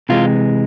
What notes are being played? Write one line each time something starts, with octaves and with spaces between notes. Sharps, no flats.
C3 E3 G#3 F4